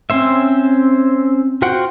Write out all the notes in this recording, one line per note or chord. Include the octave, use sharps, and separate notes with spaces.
C4 C#4 C5 E5
F4 F#4 C5 F#5 G5